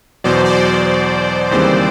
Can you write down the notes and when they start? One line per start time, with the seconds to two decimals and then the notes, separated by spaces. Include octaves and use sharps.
0.24 E2 B2 F#3 C5 D5
0.45 C5 D5
0.67 C5 D5
1.51 D#2 C#3 E3 G3 C4 C5 D5